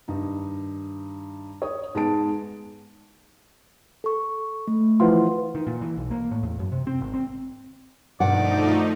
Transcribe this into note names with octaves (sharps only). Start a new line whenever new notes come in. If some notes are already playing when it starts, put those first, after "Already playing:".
G2 D#3 D#4
C#5 D#6
G#2 G#3 B3 A5 D7
A4 C#6
A3
E3 F3 F4 B4 F#5 C6
D#3
A#2
E3
B1
A#3
A2
E2
F#2
C3
C4
G#1
C4
G2 B2 D#3 F3 A3 D#4 D5 F#5